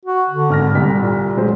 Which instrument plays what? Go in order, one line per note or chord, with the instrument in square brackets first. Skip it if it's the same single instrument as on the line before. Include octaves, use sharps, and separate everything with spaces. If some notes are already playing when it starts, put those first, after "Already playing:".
[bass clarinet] F#4
D3
[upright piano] G#1 F6 A#6
C2 G3 B6
[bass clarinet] A#2
[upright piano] F#3 G#3 C5